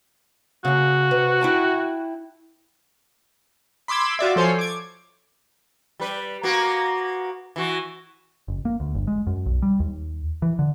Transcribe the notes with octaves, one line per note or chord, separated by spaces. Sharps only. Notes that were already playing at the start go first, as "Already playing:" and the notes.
C#3 A#3 F#4
C3 B4
E4 G5 A5
B5 C6 D6 E6 G#6
F4 F#4 D5 E5
F3 A4 C5 C#5 G#5 C7
D6 G#6
G3 B4
A#3 B3 F#4
E3 F#4
F#1
A#3
D2
G1
G#3
F#2
B1
G3
D#2
E3
D3